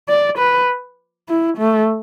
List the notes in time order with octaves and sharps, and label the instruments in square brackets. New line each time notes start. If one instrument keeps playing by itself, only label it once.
[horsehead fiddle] D5
B4
E4
A3